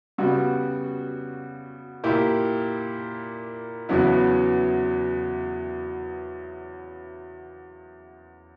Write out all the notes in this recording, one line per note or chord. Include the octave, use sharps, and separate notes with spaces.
C#3 G3 B3 F#4
A#2 A#3 E4 G4
E2 C#3 F#3 B3 E4